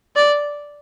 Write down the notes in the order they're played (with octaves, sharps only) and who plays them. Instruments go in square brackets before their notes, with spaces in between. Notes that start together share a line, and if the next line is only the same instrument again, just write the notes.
[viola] D5